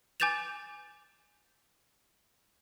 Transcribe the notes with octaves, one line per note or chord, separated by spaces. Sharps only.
G#5 D6 G6 A6 E7 F7